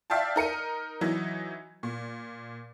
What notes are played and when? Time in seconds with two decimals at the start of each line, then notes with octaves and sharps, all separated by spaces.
0.10 D5 E5 F5 G5 A5
0.36 D#4 A#4 C#7 D#7
1.01 E3 F#3 D#4 E4
1.83 A#2